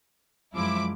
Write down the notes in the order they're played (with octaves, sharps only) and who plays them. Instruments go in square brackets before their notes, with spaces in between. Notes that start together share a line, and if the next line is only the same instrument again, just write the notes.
[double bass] F#2 G#3 [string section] F3 E4 D6